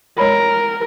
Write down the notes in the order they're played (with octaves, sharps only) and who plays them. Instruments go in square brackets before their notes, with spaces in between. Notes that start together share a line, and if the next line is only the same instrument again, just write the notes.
[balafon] G#3 C#5 B5 [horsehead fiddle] A#4